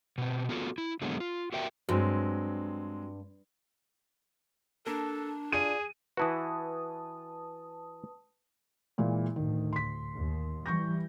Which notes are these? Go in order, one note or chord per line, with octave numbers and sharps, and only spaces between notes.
B2 C4
B3 F4 F#4 A4
E4
D3 F#3 G#3 A#3 B3
F4
F#4 G4 A#4 E5 G5
G2 F#3 G#3 C4
A#3 D4 A4 A#4
F4 G#4 D5 D#7
E3 E4 F#4 B4 A5 D#6
A#2 E3 G#3
D2 A2 D#3
C6 B6
D#2
E3 G3 C#6 G6 A#6